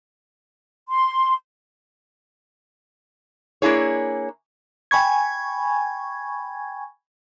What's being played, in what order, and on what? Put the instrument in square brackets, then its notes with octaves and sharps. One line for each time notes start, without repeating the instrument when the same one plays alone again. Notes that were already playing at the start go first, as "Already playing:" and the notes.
[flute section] C6
[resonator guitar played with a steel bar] A#3 D4 E4 G#4 C#5
[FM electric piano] G5 G#5 B5 C#6 G#6